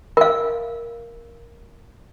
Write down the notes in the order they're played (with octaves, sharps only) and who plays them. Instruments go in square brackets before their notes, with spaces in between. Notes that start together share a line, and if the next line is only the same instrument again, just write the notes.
[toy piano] A#4 F5